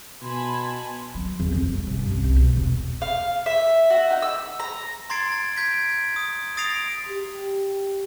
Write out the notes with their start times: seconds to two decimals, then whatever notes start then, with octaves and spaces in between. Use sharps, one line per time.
0.22 B2 G#5 A5 B5 C6
1.15 F#3
1.40 E2
1.52 F2
1.67 G3
1.87 C3
1.99 G2
2.11 C2
2.24 C2
2.37 B2
2.56 E1
3.02 F5
3.46 E5
3.90 F#4
4.11 D#4
4.22 E6
4.60 A#5
5.10 A#5 C6 G#6 A6 C7 D7
5.32 A6
5.56 G6 G#6 B6 D7
6.16 D#6
6.57 D#6 A6 A#6 C7 D7 F7
7.09 G4